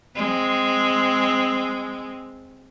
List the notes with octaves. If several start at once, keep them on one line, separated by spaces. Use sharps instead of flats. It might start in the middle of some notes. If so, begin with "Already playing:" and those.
G#3 C4